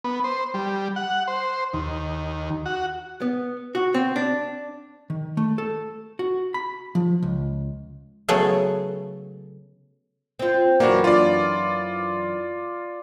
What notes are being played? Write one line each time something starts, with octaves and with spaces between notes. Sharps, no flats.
B3
C5
G3
F#5
C5
D#2
F#4
B3
F#4
C4
D4
D#3
A3
A4
F#4
B5
F3
C#2
C#3 F#3 A3 B3 G#4 A4
C4 F4
F#2 E3 A#3 D4 F#4
F4 D5